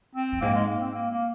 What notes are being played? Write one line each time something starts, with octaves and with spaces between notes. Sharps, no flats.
C4
F2
G#2 A#3
G#3
A#3
C4
A#3
A#3